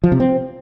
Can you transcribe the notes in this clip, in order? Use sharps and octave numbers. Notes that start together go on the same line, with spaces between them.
F3
C3
C4